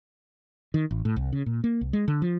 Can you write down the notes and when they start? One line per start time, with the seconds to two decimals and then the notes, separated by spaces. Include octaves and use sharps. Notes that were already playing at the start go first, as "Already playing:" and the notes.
0.74 D#3
0.91 A1
1.05 A2
1.16 C2
1.33 C#3
1.46 A#2
1.64 A#3
1.81 C2
1.93 G#3
2.08 D3
2.22 F3